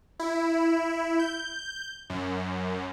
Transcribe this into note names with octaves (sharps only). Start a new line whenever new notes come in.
E4
G6
F#2